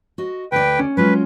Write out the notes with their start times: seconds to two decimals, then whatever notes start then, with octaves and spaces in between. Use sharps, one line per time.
0.18 F#4 D#5
0.52 D2 B4 D5 G5
0.79 C#4
0.97 F#3 G#3 F4 B4